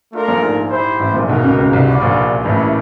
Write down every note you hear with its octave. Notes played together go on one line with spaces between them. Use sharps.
A3 D4 F4 A#4
A#1 A#2
G#2
E4 G4 C5
A1 A2
A#1 A#2
B1 B2 A#3 D#4 F#4 A#4
C#2 C#3
C#2 C#3
C2 C3
D4 F#4 B4 D5 F5
A#1 A#2
A1 A2 G3 A#3 C#4 E4